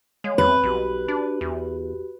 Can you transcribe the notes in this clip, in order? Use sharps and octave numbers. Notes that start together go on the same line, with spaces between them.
G#3 C#5 F5
E2 C4 B4
B1 F#4 G4
D4
E2